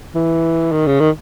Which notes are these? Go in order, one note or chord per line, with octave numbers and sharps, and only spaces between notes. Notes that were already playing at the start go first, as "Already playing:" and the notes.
E3
D#3
C#3
D#3